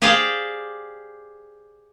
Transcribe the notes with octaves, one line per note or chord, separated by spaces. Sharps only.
G4 G#4 C5 D5 F5 G5